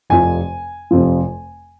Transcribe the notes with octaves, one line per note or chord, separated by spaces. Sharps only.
F1 F2 C3 F3 G#5
F1 F2 C3 F3